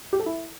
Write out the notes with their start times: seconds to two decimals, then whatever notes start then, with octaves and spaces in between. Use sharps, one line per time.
0.13 G4
0.19 A4
0.26 E4